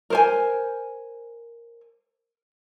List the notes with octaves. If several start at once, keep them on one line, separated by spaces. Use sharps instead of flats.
A#4 C5 G#5